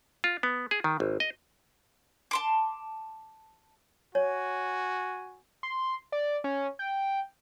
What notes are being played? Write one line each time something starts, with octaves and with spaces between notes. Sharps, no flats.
F4
B3
G#4
D#3
G#1
D#5
A5 C6 D6
F#4 C#5 G#5
C6
D5
C#4
G5